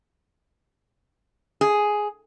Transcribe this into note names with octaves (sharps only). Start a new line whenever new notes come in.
G#4